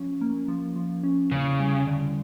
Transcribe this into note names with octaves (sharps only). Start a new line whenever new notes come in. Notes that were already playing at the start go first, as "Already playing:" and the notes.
Already playing: F3 C#4
A#3
F3
F3
C#4
E2 C#3
G3
D3